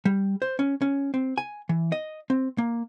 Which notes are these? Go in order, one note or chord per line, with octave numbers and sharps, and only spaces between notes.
G3
C5
C#4
C#4
C4
G#5
E3
D#5
C4
A#3